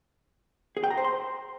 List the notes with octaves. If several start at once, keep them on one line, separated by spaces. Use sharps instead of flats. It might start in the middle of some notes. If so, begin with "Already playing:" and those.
G#4
G5
A#5
C5
C6